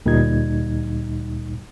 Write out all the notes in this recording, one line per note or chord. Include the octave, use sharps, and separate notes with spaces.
D2 A#2 G3 D#4 G#6